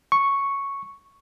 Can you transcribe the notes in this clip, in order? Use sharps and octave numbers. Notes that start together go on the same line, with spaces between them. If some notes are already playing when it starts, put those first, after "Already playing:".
C#6